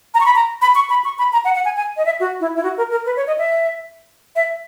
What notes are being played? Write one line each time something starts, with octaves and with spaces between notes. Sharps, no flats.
A#5
C#6
B5
A#5
B5
C#6
B5
C#6
B5
A#5
F#5
F#5
G#5
G#5
D#5
E5
F#4
E4
E4
F#4
A#4
A#4
B4
C#5
D#5
E5
E5